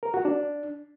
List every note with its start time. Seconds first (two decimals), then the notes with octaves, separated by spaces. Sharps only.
0.03 A#4
0.14 F#4
0.25 D4